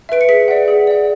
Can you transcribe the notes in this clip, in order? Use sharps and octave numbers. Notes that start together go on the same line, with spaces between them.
B4 E5 D7
C#7
G#4 B6
D5 F#5
G#4
D5 F#5